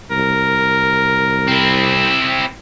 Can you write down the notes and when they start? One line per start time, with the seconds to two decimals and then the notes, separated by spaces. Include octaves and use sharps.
0.11 C2 A#4
1.48 C4 E4